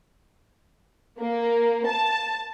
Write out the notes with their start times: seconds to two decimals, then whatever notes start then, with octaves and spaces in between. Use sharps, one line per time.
1.19 A#3
1.86 A5